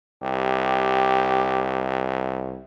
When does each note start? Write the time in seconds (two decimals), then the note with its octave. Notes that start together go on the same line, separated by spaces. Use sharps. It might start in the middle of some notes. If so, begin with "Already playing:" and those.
0.23 C2 G4